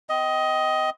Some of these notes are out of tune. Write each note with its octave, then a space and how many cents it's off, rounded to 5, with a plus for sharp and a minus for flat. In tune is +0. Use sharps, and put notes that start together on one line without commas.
C4 -25 D#5 +15